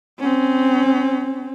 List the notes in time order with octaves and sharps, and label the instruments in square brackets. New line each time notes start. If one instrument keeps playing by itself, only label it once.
[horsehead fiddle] C4 C#4